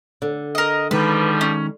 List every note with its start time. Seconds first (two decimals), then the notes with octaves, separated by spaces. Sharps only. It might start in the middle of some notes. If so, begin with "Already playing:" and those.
0.22 D3
0.55 A#4 D#5
0.91 B2 D#3 F3 G3 G#3 B4
1.41 C#4